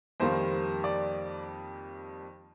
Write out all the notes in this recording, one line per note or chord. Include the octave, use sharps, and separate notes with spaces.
F2 D#3 G3 A#3 C5
D5